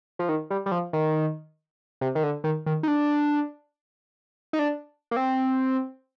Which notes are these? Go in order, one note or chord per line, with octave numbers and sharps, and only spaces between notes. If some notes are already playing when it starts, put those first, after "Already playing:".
F3
D#3
G3
G3
F3
D#3
C3
D#3
D3
D#3
D#3
D#4
D4
D#4
D4
A#3
C4